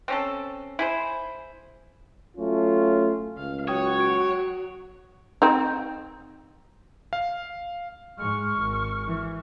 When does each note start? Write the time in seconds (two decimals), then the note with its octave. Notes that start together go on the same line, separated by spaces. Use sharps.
0.08 C4 C#4 A4
0.79 E4 G#4 C5
2.36 F#3 A3 C#4 F4
3.38 C#2 F5
3.68 F#3 F#4 C#5 G5 D#6 G#6
4.00 D7
5.42 C4 D#4
7.13 F5
8.18 G#2 G#3 C#6 F6
8.60 G#1
9.07 E3